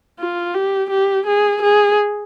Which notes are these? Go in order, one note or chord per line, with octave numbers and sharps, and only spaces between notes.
F4
G4
G4
G#4
G#4